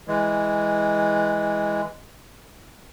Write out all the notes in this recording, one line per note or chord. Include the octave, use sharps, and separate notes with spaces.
E3 G#3